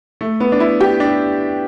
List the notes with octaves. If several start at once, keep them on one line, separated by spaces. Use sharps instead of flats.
A3
B3
D4
E4
G4
D4